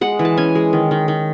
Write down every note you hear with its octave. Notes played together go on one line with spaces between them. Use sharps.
G#3 F#5
E3
A5
C#4 G#5
G#3
D#3
D#3
D#3